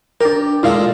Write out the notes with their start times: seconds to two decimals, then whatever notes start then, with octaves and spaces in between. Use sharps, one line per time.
0.21 D4 G4 A#4
0.63 A#2 G#3 E4 F4 A4 F5